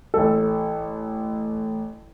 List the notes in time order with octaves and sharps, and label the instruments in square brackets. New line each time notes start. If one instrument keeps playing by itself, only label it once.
[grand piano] A1 A3 A4